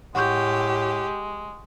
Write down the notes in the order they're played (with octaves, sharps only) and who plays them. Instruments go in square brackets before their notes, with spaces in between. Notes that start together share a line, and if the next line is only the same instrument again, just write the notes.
[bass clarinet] A2 [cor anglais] G#3 [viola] G4 [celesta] F#5 C#6 G6